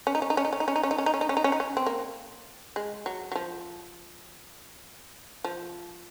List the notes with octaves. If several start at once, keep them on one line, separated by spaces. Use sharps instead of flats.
C#4
D#4
C#4
D#4
C#4
D#4
C#4
D#4
C#4
D#4
C#4
D#4
C#4
D#4
C#4
D#4
C#4
D#4
C#4
D#4
C#4
C4
A#3
G#3
F#3
F#3
F3
F3